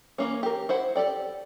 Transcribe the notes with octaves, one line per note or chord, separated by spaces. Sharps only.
E3 A#3 C#4
G4 A#4
E4 C5 F#5
G4 A4 D5 G5